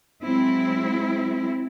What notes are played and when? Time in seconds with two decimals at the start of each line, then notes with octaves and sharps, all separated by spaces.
0.23 F#3 G#3 C4 E4